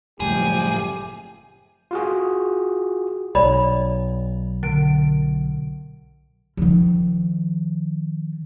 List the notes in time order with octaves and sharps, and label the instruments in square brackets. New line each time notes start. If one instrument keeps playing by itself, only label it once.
[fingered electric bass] F#1 A2 G3 [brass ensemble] F3 G4 [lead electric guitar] G#4
[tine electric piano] F4 F#4 G#4
[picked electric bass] B1 [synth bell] C#5 [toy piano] D5 B5
[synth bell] D3 D7
[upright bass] D#3 F3